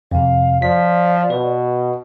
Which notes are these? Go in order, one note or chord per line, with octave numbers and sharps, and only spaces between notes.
F2 C3 F5
F3 D5 B6
B2 B4